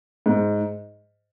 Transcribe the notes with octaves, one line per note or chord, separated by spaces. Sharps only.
G#2